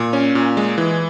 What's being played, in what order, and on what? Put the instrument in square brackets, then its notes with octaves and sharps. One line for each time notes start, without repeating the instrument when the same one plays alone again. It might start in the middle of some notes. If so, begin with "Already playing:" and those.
Already playing: [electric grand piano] A#2
C#4
A#2
G#3
E3